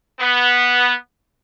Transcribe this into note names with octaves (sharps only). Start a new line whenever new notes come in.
B3